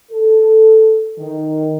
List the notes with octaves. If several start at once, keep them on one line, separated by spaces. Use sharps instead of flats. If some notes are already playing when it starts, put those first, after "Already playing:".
A4
D#3